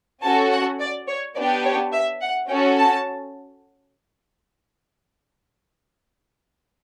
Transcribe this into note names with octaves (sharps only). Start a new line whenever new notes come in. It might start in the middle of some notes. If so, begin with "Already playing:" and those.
C#4 F#4 A4 A5
F#5
D5
C#5
B3 D4 G4 D5
C#5
E5
F#5
C#4 F#4 A4 G5
A5